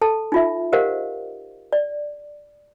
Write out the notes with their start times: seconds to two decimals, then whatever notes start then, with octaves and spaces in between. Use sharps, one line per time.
0.02 A4 A5
0.32 D#4 F4 E5
0.72 G4 A#4 C5 D#5 F5 F#5
1.73 D5